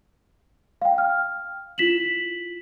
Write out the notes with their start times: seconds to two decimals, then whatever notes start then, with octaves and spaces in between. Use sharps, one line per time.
0.82 F5 G5
0.98 F6
1.78 E4 F4 B6 E7 F#7